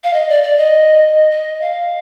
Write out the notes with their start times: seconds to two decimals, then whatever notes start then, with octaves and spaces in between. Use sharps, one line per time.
0.04 F5
0.13 D#5
0.29 D5
0.43 D5
0.57 D#5
1.31 D#5
1.61 F5